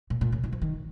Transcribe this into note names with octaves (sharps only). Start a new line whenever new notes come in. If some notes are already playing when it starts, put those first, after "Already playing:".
A#2
A#2
C#3
D#3
F3
D#3